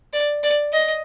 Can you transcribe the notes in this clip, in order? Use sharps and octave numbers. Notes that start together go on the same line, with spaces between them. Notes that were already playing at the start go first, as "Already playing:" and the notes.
D5
D5
D#5